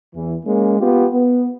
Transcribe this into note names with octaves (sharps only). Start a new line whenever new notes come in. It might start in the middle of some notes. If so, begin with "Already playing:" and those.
E2 E3
G#3 A#3 C#4
B3 F4 G4
B3